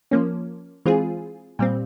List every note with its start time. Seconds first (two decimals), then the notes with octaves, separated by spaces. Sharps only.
0.11 F3 A#3 C#4
0.86 E3 G#3 C4 F4 G#4
1.59 A#2 G3 C4